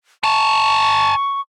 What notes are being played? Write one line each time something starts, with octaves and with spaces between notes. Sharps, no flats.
G#5 A5 C#6